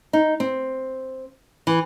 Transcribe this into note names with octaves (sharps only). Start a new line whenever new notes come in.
D#4
C4
E3